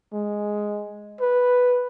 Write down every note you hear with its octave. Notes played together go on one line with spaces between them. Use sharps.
G#3
B4